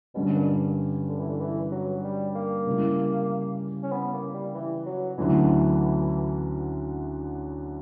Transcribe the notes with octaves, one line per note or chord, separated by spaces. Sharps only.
G2 B2 D3 G3 C#4
A#2
D3
E3
D3
E3
F#3
G3
A#3
C#3 G3 C#4 E4
C#4
B3
A#3
G3
E3
F#3
D2 D3 E3 F#3 C#4 E4